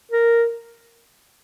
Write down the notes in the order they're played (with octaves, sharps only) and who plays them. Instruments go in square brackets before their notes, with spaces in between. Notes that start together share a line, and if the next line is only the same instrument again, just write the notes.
[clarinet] A#4